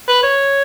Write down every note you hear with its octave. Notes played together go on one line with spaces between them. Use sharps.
B4
C#5